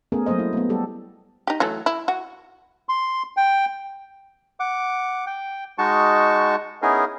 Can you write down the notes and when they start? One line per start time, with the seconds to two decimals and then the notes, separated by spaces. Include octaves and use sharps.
0.12 A3 B3 C#4 G#4 A#4
0.26 F#3 A3 A#3 C5 D#5
0.39 E4
0.53 A3 B3
0.69 G3 G4 A4
1.47 D#4 G4
1.60 E3 F#3 A3
1.86 E4
2.08 F#4
2.89 C6
3.37 G5
4.60 F#5 D6
5.27 G5
5.78 G#3 D#4 F#4 A5 C#6
6.82 B3 C#4 D#4 E4 G#4 A#4